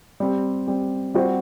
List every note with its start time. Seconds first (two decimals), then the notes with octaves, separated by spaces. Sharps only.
0.20 G3 C4 G4
0.67 G3 C4 G4
1.14 G3 C4 F#4 C5